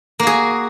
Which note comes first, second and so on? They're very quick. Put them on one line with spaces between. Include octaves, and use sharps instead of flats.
A#3 F#4 G#4